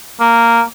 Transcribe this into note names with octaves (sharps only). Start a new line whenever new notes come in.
A#3